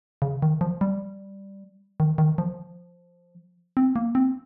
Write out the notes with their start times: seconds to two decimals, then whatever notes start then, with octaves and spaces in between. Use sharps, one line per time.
0.22 C#3
0.42 D#3
0.61 F3
0.81 G3
2.00 D#3
2.18 D#3
2.38 F3
3.77 C4
3.96 A#3
4.15 C4